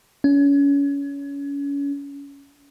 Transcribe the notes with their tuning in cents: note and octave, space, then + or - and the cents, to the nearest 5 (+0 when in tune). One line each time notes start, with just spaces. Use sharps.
C#4 +30